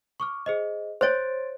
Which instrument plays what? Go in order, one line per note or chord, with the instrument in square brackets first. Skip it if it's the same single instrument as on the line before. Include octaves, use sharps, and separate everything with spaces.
[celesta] C#6 D6 F6
G#4 C5 D#5
[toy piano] C5 C#5 [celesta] C6 A6 D7